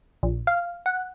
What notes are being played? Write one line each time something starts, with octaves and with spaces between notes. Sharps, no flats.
A#1
F5
F#5